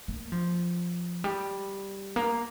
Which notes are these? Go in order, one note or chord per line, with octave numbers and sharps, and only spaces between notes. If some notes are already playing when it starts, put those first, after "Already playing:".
A#3
F3
G3
A#3